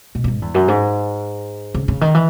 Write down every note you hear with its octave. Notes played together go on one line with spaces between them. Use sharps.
B2
F#2
G#2
E2
F#2
G#2
C#3
C#3
D#3
E3